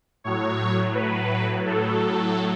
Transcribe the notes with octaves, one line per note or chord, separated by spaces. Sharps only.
A2 F#3 C#5
B4
A2 F#3 A4